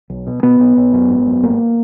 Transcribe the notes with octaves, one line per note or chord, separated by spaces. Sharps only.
B1
B2
B2 B3
B1
B1
F#2
G#1
F#2
G#1 A#3